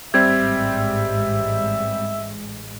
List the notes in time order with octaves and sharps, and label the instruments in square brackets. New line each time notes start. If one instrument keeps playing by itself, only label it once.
[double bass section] A1 G#2 G#3 [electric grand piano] G3 C4 G4 [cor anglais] E5 [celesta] G#6